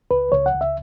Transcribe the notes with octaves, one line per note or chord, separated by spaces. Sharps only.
C#2 B4
C#2 C#5
F#5
C#2
E5